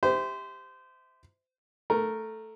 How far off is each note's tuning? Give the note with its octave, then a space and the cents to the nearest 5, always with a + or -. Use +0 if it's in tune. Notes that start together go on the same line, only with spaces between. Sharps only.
G4 +10 C5 -25 E5 -20
A3 +0 A#4 -5